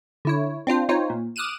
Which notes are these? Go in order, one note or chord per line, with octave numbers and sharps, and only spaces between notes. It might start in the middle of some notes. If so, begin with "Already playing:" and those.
D3 E4 C#5
C4 D4 F4 C5
C4 D#4 F4 C5 C#5
A#2
D6 D#6 F6 F#6 D#7 E7